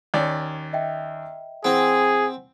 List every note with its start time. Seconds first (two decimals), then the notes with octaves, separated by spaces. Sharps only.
0.14 D#2 C#4 D5
0.73 D#5 E5 G5
1.64 E3 C4 G#4 C5 F#5 G#5